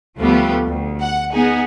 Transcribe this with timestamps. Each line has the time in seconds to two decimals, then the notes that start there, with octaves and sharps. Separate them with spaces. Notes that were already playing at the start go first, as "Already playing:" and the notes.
0.19 D2 F3 G3 A3 B3 G4
0.67 D2
1.01 F#5
1.33 B3 D#4 G#4